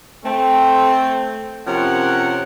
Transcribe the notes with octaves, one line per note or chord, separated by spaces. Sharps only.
A3 C4
C3 F3 C#4 A#4 F#5